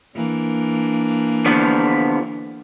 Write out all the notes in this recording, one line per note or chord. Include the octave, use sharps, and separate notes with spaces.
E3 A#3 D4
D3 F3 B3